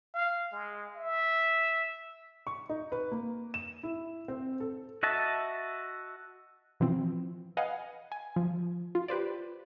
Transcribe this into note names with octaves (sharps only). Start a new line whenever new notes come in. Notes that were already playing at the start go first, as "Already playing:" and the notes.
F5
G#3
E5
C#6
D#4
B4
A#3
E7
E4
C4
A4
F#4 D#5 E5 A5
B2 E3 F3 C4
B4 D#5 F5 F#5 G#5
G#5
F3
F4
G4 B4 C5 D5